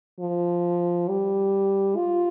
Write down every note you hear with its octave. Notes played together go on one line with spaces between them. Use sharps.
F3
G3
F4